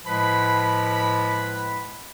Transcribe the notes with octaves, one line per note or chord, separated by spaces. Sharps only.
A2 F3 G#3 B4 B5